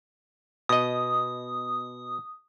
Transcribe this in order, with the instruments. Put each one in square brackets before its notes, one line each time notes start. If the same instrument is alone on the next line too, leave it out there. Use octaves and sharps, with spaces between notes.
[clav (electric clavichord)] B2 D#5 [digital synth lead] D#6